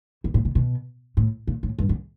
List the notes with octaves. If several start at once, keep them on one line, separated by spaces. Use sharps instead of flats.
G2
A#2
B2
B2
A2
A#2
A2
G2
F#2